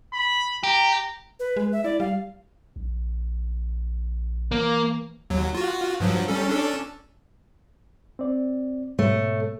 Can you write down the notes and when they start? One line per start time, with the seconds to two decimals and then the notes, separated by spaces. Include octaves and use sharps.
0.13 B5
0.63 G4 A#5
1.40 B4
1.57 G#3
1.72 E5
1.84 E4 D5
2.00 G3 F5
2.76 A#1
4.52 E3 A#3
5.30 D#2 F#3
5.55 F4 F#4
6.00 G2 F3 F#3
6.28 G3 C#4 A4
6.47 C#4 D4 A4
8.19 C4 D5
8.99 G#2 B2 A3 C#5